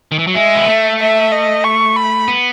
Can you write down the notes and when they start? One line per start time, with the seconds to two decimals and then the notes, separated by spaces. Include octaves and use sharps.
0.12 D#3
0.19 E3
0.27 F#3
0.35 G#3 E5
0.55 B3
0.68 A3
1.00 E5
1.32 D#5
1.64 C#6
1.96 B5
2.28 B3